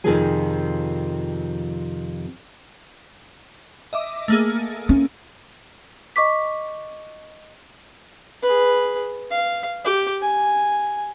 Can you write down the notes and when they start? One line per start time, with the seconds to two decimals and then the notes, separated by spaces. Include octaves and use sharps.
0.04 F2 C3 D#3 F3 G#4 G#5
3.93 D#5 E5 D6
4.28 A3 A#3 G#4
4.89 C#4
6.16 D#5 C#6 D6 B6
8.42 G#4 B4
9.31 F5
9.84 G4
10.21 G#5